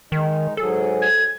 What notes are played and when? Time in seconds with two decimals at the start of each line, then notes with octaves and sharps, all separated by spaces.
0.12 D#3 G#3 D#4
0.57 G#2 F#3 G#4 A4
1.02 G#6